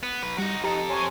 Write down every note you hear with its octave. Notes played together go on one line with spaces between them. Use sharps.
B3
F#3 B4
G3 D#4 F#4
F2 D#4 G4 A4 A#5
C#5 G#5 C6